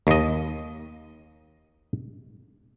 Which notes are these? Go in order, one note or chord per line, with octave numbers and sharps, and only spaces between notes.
D#2 D#5